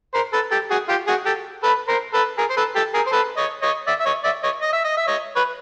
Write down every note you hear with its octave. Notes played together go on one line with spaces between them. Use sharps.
A#4 C5
A4 B4
G4 A4
F#4 G#4
F4 G4
F#4 G#4
G4 A4
A4 B4
A#4 C5
A4 B4
G#4 A#4
C5
A4 B4
G4 A4
G#4 A#4
C5
A4 B4
C#5 D#5
C#5 D#5
D5 E5
E5
C#5 D#5
D5 E5
C#5 D#5
D#5
E5
D#5
E5
C#5 D#5
B4 C#5